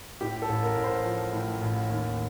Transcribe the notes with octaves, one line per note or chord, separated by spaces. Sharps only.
A2 G4
A4
A1
A#4
A1
C5
F3
A2
A1
D#2